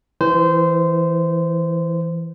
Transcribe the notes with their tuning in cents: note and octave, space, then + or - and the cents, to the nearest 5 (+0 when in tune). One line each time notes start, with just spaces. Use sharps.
E3 +0 C5 -20